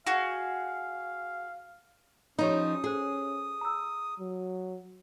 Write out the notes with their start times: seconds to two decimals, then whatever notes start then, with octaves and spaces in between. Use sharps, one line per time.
0.07 F#4 G#4 F5
2.39 F3 C#4 D#4 G4 C#5 B5 D#6
2.84 G#4 A4 C5
3.61 A#5 E6
4.20 F#3